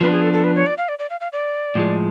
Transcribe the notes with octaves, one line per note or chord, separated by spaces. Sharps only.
F3 B3 D4 B4
G#4
A4
A4
B4
C#5
D5
F5
D5
D5
F5
F5
D5
A2 F3 G#3